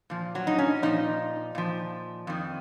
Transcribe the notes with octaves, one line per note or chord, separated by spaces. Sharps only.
A#2 F3
F#3
D#4
C#4
A#2 F3 D#4
A#2 F3
F2 D#3